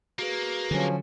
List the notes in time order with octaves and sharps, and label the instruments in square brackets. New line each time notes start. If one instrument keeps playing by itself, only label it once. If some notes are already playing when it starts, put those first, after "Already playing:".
[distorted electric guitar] A#3 [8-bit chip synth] F#4 G#4 B4
[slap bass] D3 F#3 [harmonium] F3 C#4